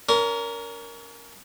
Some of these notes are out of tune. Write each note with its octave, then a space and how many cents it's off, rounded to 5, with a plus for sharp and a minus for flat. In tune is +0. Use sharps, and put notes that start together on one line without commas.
C#4 +40 A#4 +0